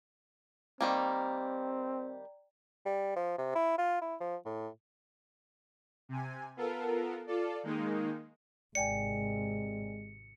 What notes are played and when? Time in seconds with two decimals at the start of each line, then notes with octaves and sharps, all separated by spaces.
0.81 D#3 G3 A#3 C4 D5 G5 A#5
2.86 G3
3.16 F3
3.38 C3
3.55 E4
3.78 F4
4.02 E4
4.21 F3
4.46 A2
6.09 C3 G#5
6.57 B3 F4 A4 A#4
7.27 F4 A4 D5
7.63 D#3 G#3 A#3 D#4
8.75 G#1 C3 G#3 D5 G5 G#5 C#7